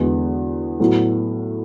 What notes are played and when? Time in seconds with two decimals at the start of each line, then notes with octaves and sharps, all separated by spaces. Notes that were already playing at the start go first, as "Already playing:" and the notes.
Already playing: E2 D3 G#3 B3 F#4
0.80 A2 F#3 B3